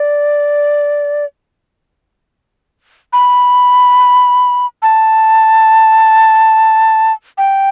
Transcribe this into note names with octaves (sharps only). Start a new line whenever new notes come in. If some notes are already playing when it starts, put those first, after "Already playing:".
Already playing: D5
B5
A5
G5